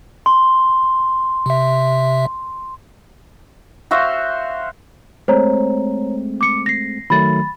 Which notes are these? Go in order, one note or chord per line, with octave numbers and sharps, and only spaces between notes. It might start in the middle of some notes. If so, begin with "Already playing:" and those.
C6
C3 E5
F#4 C5 E5 F5
G#3 A3 C4 C5 C#5 A#5
D6 C#7
A#6 C7
D#3 F#3 A3 B5 A6